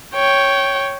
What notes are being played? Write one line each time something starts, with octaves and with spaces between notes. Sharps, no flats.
C#5 G5